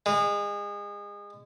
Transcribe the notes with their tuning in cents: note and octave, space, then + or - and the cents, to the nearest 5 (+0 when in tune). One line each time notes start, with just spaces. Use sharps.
G#3 -30